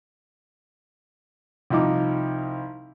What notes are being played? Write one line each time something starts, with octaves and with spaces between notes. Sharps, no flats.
C2 F3 D#4 D6